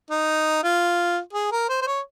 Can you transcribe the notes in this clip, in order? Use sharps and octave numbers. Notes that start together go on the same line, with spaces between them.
D#4
F4
G#4
A#4
C5
C5
C#5